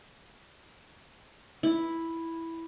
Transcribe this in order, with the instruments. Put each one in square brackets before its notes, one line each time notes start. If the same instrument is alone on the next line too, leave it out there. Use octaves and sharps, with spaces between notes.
[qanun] E4